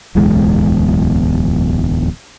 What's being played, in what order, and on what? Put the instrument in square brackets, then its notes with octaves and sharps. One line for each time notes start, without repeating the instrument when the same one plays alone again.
[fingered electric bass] D1 B1 E2 G#3